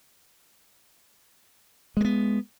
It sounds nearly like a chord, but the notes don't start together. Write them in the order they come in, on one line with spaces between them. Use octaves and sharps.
G#3 A#3 B3